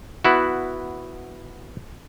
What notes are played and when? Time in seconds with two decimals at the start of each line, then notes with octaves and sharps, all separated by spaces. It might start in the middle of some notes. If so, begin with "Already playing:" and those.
0.25 B3 E4 F#4